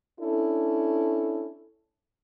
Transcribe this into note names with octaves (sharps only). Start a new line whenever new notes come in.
C#4 D4 E4 A4